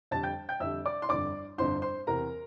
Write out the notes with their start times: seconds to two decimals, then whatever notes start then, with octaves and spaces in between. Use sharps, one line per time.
0.11 F2 D3 G3 A5 A6
0.23 G5 G6
0.49 G5 G6
0.60 F2 D3 G3 E5 E6
0.85 D5 D6
1.02 C6
1.09 G1 F2 D3 D5 D6
1.58 G1 F2 D3 C5 C6
1.82 C5 C6
2.07 E2 C3 E3 A#4 A#5